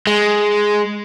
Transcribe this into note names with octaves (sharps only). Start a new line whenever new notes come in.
G#3